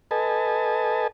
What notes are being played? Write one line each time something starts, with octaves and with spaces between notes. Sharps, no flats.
A4 B4 D#5 G#5 A5